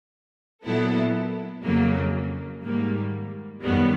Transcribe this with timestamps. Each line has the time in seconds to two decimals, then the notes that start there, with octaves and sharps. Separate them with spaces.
0.64 A#2 F#3 B3 E4 A4
1.64 F2 C#3 F#3 A#3
2.64 G#2 D#3 G3 A#3
3.64 F#2 D#3 G3 B3